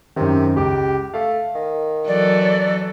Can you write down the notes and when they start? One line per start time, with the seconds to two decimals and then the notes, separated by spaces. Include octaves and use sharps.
0.16 F#2 C3 D#3
0.56 C#2 G4 D6
1.14 A3 F5
1.55 D#3
2.08 E3 F#3 A4 D5
2.41 C#5